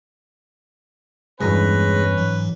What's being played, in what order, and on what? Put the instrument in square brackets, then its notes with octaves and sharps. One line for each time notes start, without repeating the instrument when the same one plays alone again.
[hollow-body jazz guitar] B1 E2 G2 [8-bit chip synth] G#3 G#4 A#6 [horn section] C#4 B4
[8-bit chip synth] G#2 E3 F#3